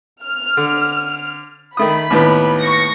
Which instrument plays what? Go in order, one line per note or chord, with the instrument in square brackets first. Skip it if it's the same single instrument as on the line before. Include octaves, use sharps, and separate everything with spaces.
[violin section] F6
[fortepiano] D3
[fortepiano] D#3 A3 D#6 [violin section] B5
[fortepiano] D#2 A2 B3
[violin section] C#6 A#6